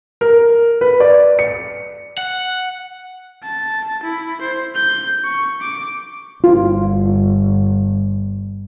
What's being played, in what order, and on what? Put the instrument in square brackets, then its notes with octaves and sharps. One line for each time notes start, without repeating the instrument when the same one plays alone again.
[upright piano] A#4
B4
D5
C#7
[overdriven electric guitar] F#5
[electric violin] A5
E4
C5
G6
C#6
D6
[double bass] G1 [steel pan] F4